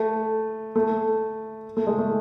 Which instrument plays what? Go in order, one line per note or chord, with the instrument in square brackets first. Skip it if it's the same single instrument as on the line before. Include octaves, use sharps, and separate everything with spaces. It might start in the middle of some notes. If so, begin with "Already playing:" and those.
Already playing: [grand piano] A3
A3
A3
G#3
A3